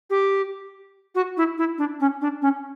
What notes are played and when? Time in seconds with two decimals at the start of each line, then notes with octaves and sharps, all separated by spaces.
0.10 G4
1.15 F#4
1.37 E4
1.58 E4
1.78 D4
2.00 C#4
2.21 D4
2.42 C#4